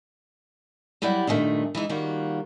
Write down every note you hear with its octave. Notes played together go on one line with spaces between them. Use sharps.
F#3 G3 E4 G4 D5 F#5
G2 A#2 D#3 G3 A3
E3 G#3 D#4 E4
D#3 G3 A#3 F4 F#4